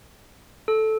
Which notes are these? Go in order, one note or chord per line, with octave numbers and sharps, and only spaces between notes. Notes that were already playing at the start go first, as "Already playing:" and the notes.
A4